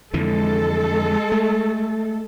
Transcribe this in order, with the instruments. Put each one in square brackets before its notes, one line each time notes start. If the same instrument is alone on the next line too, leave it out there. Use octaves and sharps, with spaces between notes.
[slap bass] F2 D3 E3 [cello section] G#3 A4
[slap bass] A3